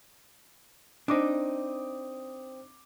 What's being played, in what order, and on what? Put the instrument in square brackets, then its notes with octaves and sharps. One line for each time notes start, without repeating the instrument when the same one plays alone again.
[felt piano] C4 D6 D#6 [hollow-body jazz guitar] D4 D#4